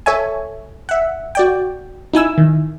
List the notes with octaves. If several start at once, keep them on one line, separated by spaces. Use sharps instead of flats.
A4 C#5 E5 G#5
E5 F#5
F#4 D5 G5
D#4 E4 G#5 E6
D#3